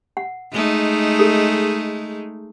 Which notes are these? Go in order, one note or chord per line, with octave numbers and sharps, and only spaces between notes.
F#5
G#3 A3 D#4
G#4 A4